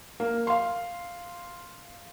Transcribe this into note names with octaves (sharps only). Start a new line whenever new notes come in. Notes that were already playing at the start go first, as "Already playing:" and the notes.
A#3
F5 C6